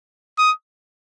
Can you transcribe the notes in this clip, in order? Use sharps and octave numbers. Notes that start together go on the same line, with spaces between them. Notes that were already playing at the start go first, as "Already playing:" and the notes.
D#6